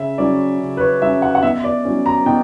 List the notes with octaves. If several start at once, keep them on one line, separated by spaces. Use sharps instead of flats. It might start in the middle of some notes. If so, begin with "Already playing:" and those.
Already playing: C#3 E5
F#3 C#4 D5
C#3
B4
C#5
F#3 C#4 E5
F#5
F#5
B2 E5
D5
F#3 C#4
A#5
B2 G5